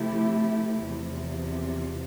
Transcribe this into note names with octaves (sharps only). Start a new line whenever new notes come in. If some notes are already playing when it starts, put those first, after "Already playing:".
Already playing: C3 F3 A3 E4 G4
E2 C3 F3